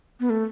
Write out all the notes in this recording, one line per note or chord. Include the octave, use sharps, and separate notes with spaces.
B3
A3